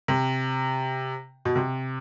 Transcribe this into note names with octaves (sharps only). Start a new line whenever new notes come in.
C3
B2
C3